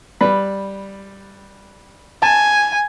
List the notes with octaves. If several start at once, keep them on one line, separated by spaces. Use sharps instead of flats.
G3 B4
G#5 A5